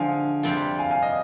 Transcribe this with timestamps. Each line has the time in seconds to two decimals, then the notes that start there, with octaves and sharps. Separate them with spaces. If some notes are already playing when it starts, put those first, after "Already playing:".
Already playing: D3 F3 G#3 F5 G#5
0.43 F2 C3 G3 C4 F4
0.79 F5 G#5
0.91 F5 G#5
1.03 D#5